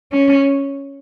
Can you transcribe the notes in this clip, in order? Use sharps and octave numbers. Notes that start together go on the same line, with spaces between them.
C#4